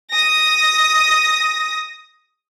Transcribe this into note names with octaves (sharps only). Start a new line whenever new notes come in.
D#6 A#6